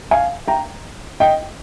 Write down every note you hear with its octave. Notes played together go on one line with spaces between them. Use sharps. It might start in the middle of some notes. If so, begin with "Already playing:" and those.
F5 G#5
G5 A#5
D#5 G5